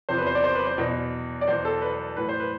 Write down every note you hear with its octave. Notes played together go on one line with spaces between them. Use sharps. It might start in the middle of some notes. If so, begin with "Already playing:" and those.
E2 C3 F3 C5
B4
C5
D5
C5
B4
C5
E2 B2
D5
E2 B2 C5
A4
B4
A2 E3 B4
C5
B4